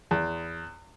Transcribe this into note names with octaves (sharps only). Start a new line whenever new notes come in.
E2